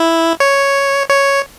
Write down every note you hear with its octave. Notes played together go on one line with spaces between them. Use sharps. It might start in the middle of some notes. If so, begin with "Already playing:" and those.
Already playing: E4
C#5
C#5